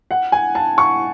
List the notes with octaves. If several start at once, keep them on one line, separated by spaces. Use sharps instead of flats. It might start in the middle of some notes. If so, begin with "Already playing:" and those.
F#5
G#5
A5
C#6